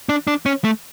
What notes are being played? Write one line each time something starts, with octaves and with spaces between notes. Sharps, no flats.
D4
D4
C#4
A3